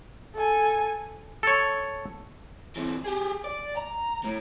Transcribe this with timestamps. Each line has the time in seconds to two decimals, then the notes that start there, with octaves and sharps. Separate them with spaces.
0.35 A4 G#5
1.43 A4 C#5
2.76 E3 C4
3.04 G4 G#4
3.44 D5
3.77 A#5
4.24 A2